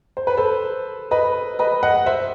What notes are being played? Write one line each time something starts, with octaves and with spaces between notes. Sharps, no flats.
C5
B4
A4 C5
B4 D#5
B4 D#5
D#5 F#5
C5 E5